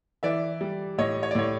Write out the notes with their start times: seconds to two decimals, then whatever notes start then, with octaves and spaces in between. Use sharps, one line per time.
0.23 E3 D5 E5
0.61 G3
0.98 A2 C#5 D#5
1.23 C#5
1.31 D5
1.35 A2 C#5